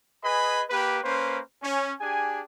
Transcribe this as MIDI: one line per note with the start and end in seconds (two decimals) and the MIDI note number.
0.24 0.63 68
0.24 0.63 71
0.24 0.63 75
0.24 0.63 80
0.24 0.63 83
0.70 0.98 58
0.70 0.98 67
0.70 0.98 71
1.04 1.39 58
1.04 1.39 61
1.04 1.39 71
1.04 1.39 72
1.63 1.92 61
2.00 2.41 62
2.00 2.41 67
2.00 2.41 68
2.00 2.41 80